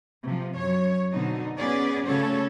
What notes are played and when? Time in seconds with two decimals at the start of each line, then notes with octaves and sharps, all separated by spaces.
0.24 C3 F3
0.55 F#2 C#5
1.13 B2 D3 C4 D#4
1.56 B3 C#4 G#4 B4 D5
2.05 C#3 A3 C#4 F#4 A4 C#5